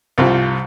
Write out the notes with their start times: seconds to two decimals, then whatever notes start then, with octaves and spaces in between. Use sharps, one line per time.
0.18 C2 C3 F3 C4 F4